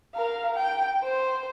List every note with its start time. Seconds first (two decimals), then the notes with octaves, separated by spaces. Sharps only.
0.14 A#4 F5
0.54 G5
1.03 C5